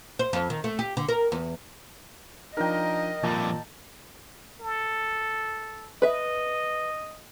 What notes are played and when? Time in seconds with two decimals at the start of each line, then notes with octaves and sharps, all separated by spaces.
0.19 C5
0.33 F2
0.50 D#3
0.64 A3
0.79 G4
0.97 D3
1.08 A#4
1.32 E2
2.57 F3 D4 D#4 A#4 D#5 G5
3.23 F2 A#2 G3 A5 A#5 A6
4.61 A4
6.02 B4 D#5 E5